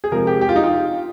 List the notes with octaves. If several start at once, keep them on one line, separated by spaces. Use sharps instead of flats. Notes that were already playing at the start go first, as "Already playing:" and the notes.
G#4
C3 F3 G#3 A#4
G4
G4
F4
D#4
F4